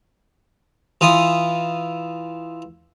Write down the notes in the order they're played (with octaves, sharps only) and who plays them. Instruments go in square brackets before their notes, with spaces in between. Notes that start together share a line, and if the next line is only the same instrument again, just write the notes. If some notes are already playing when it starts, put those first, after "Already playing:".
[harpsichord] E3 F4 D#6